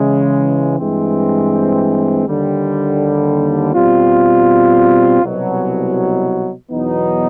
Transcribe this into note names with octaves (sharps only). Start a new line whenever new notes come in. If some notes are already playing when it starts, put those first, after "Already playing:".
Already playing: C#3 E3 G#3
G2 E3 G#3 C4
D#2 D3 G3
B2 G3 C4 F4
C2 B2 F#3
E2 B2 F#3 B3 D#4